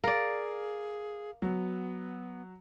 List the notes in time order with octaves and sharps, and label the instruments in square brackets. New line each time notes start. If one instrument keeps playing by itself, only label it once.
[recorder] G#4 [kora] A#4 D5 [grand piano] F5
[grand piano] F#3 [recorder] B3